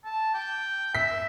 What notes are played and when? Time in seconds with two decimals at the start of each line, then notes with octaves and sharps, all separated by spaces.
0.05 A5
0.34 G5
0.95 E5 B6